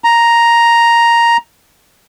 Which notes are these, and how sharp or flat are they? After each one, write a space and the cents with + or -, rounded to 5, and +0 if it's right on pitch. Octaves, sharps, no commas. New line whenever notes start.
A#5 +5